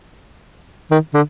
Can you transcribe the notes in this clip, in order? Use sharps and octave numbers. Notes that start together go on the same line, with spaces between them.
D#3
D3